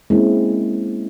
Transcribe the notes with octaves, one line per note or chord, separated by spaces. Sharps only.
G#3 A#3 C4 C#4 E4